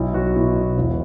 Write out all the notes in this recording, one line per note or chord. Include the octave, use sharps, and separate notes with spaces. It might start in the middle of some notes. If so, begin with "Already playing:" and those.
Already playing: B1 E4
B1 F#4
B2 E4
B2
E1 E4